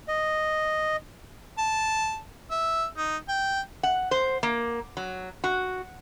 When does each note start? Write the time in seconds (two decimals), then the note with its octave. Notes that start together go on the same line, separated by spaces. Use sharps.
0.08 D#5
1.58 A5
2.51 E5
2.97 D#4
3.29 G5
3.83 F#5
4.11 C5
4.43 A#3
4.97 F#3
5.44 F#4